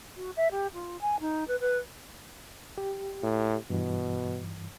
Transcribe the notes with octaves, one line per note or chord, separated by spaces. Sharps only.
F#4
E5
G4
F4
G#5
D#4
B4
B4
G4
A2
G2 B2 E3